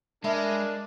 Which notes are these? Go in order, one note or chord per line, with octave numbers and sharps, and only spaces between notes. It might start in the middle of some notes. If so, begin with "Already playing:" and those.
G#3 D4 A#4 E5 B5